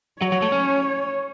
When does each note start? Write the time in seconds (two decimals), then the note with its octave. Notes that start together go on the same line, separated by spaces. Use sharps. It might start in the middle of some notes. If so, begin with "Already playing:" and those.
0.22 F#3 C#5
0.32 F#3
0.42 A3
0.52 C#4